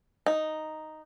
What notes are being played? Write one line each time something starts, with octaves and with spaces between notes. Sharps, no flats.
D#4